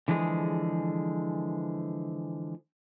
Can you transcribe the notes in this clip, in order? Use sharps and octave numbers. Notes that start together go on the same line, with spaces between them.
D3 E3 F3 G#3 G#4